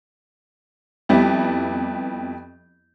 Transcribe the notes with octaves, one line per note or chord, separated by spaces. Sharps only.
F2 G3 B3 E4